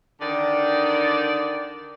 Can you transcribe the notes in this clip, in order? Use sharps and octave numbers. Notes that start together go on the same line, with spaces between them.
D3 D#3 D5